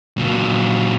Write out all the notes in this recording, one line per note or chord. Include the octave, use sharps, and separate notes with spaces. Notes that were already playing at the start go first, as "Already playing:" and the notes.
A#2 F#3